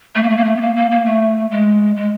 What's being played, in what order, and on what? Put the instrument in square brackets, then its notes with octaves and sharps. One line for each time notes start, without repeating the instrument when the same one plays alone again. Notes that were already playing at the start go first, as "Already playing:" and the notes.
[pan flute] A3
A#3
A3
A#3
A3
B3
A#3
A#3
A#3
A3
G#3
G#3